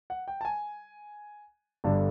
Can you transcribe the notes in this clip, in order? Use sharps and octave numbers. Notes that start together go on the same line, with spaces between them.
F#5
G5
A5
G#5
G1 G2 D3 G3 A5